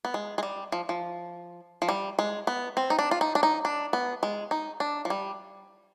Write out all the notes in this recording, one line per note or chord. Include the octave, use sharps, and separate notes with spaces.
B3
G#3
G#3
G3
F3
F3
F3
G3
G#3
B3
C4
D#4
D4
F4
D#4
D4
D#4
D4
B3
G#3
D#4
D4
F3
G3